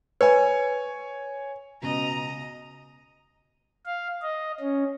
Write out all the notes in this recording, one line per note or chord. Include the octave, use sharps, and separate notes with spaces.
B4 C#5 G#5 B5
C#2 B2 D#5 A#5
F5
D#5
C#4